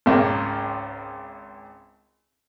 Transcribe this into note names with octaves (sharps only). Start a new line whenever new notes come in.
G#1 C#2 A#3